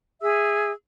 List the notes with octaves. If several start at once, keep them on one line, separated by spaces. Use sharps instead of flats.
G#4 E5 E6